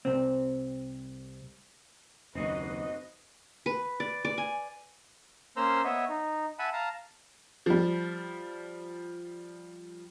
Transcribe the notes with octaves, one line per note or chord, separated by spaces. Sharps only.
C2 C4
F#1 D#2 C4 D#4 F#4 B4 D#5
B4
D5
D5
G#5
A#3 C#4 C5 A#5 C6 E6
B3 C#5 D#5 E5
D#4
E5 F#5 G#5 A5 B5
F5 A5 A#5
F3 G3